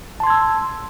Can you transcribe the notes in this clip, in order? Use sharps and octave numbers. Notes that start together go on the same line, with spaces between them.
A5 C6 E6 G#6